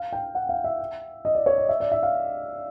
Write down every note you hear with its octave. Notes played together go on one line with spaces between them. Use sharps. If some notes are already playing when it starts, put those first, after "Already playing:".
Already playing: F5
G5
F#5
F5
E5
D#5
D5
C#5
D5
E5
D5
E5
F5